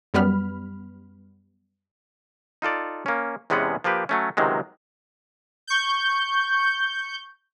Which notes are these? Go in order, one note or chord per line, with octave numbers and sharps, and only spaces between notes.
F#2 G3 B3 B5 F6
D#4 F4 A4 D5
A#3 C#4
E2 C3 G#3 B3 C#4 F#5
F3 A#3 G4 B4
F#3 A3 C#4
C#2 C3 D#3 F#3 G#3
C#6 G6